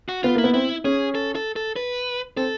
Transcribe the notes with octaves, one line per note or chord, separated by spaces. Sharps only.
F#4
B3 F4
A#3 E4
B3
C4 E4
C#4 G#4
A4
A4
A4
B4
C4 A4